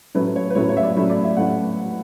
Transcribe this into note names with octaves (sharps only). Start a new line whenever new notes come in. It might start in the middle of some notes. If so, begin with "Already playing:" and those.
A2 F#3 A3 C#4 B4
C#5
B4
A2 F#3 A3 C#4 C#5
C#5
E5
D5
A2 F#3 A3 C#4
D5
E5
A2 F#3 A3 C#4 F#5